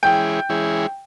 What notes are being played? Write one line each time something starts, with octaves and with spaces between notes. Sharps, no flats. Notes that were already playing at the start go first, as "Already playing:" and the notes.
E3 G#3 C#4 E4 G#4 G5
E3 G#3 C#4 E4 G#4